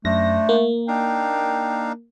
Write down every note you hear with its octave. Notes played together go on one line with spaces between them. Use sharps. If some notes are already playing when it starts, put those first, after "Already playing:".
F#2 A3 D4 C5 A#6
A#3
D4 D#4 F5 G5